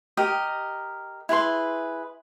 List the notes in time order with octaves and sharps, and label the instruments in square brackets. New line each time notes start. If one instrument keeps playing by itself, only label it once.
[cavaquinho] G4 A#4 D#5
E4 G#4 B4 C6